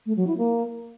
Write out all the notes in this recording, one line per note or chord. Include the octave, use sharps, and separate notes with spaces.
A3
F#3
E4
A#3